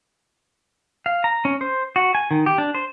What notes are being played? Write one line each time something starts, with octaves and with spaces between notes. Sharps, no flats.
F5
A#5
C#4
C5
F#4
G#5
D#3
G4
D4
C5